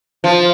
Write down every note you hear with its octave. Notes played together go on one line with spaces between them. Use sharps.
F3